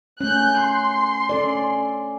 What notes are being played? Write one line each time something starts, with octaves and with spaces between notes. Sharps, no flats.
A3 C#4 F#6 G6
C6
C#4 A4 D5